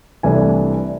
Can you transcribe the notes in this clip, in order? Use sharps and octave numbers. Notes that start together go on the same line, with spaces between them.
C2 C3 E3 A3 D4 G#5